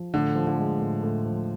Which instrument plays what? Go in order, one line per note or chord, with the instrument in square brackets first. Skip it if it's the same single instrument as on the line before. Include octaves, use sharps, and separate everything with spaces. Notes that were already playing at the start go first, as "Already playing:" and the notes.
Already playing: [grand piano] F3
[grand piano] A2 [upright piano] D3
[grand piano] F3
[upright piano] D3
[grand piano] G#3
A2
A2
F3